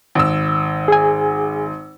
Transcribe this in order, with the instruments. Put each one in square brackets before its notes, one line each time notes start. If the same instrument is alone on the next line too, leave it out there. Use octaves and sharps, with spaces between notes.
[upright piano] G#1 E6
[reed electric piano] G#4 G#5